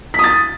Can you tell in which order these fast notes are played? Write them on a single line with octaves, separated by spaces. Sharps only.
B6 D#6 A6